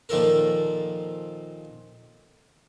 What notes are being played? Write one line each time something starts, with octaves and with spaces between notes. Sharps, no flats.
A#2 D#3 F3 A4 A#4